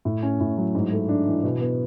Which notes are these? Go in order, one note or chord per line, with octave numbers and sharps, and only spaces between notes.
A2
C#4
A2
F#3
G#2
A3
D4
E3
B2
B3